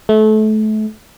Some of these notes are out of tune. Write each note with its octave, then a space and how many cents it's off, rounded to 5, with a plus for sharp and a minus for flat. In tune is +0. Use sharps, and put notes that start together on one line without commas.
A3 -30